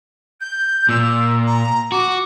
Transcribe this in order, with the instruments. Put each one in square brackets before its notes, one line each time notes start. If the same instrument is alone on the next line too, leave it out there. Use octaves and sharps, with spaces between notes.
[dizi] G6
[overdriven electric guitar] A#2 [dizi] E6
[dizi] A#5
[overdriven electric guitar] F#4 [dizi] D6